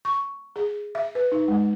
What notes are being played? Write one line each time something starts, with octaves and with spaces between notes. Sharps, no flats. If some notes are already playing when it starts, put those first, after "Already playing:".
C#6
G#4
E5
B4
D#4
G#3